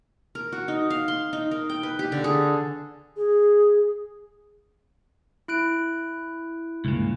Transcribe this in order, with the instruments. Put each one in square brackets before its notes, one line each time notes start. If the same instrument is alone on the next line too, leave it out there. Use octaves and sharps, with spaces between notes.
[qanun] A#4
F#4
D#4
F5
C6
D#4
A#4
G5
B4
G4
D3
G#4
[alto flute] G#4
[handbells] E4 F#6 D7
[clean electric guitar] C#2 G2 A#2